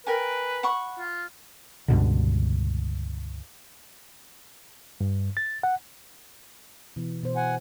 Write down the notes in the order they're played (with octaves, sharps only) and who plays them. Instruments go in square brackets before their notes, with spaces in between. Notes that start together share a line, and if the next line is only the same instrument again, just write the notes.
[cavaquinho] A#4 G5 G#5 [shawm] B4
[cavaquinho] F#5 B5 C#6
[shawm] F4
[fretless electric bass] C#2 G2 B2 D3
[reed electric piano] G2
A6
F#5
[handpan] B2 E3
B2 C5
[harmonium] F#5 G#5